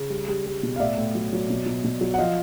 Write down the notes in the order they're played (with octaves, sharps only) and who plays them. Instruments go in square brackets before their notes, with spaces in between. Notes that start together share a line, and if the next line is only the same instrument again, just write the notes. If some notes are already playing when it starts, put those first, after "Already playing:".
Already playing: [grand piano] C#3
G3
G3
G3
B2
F5
A2 D5 E5
A2
F#3
F#3
B2
B2
B2
F#3
F#5
F3 D#5 F5